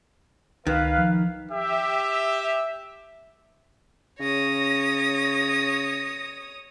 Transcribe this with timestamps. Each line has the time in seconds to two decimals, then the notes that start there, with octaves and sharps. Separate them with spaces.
0.67 C#2 D#3 B4 F5
0.97 F3
1.52 G4 E5
4.19 C#3 C#5 D#6 A#6